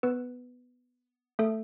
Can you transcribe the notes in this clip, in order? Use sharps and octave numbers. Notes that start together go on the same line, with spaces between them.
B3 B4
A3 A4